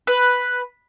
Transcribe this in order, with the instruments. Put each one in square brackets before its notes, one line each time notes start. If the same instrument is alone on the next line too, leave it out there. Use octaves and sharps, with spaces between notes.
[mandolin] B4